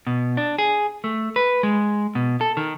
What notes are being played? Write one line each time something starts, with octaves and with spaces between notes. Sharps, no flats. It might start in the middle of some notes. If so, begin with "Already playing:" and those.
B2
D4
G#4
A3
B4
G#3
B2
A4
D#3